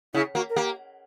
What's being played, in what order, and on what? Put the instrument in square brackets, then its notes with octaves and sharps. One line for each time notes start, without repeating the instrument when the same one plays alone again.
[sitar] C#3 [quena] E4
[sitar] A#3 [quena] F#4
[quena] A#4
[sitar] A#3 [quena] G4